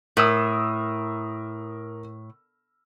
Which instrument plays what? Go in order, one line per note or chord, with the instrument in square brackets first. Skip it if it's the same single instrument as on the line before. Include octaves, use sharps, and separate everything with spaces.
[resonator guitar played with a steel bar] A2 [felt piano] A#4 D#6 E6